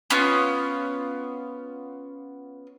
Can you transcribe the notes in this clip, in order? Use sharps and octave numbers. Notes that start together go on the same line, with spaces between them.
B3 C#4 F4